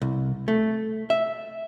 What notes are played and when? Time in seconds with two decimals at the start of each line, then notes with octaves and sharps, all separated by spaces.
0.02 C2
0.48 A3
1.10 E5